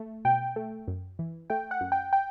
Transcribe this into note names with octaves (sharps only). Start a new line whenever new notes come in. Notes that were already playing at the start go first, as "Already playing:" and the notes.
Already playing: A3
B2 G5
A3
F#2
E3
A3 G5
F#5
F#2
G5
G5